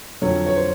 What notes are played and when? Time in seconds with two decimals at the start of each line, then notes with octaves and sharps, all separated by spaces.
0.22 F2 D3 F#3 C#5
0.46 C#5
0.57 C5